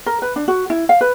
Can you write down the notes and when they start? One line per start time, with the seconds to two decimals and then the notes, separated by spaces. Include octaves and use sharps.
0.06 A#4
0.22 B4
0.36 D4
0.48 F#4
0.70 E4
0.89 F5
1.01 B4